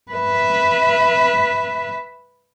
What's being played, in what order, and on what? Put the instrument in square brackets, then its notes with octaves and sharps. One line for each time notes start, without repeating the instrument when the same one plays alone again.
[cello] B4 E5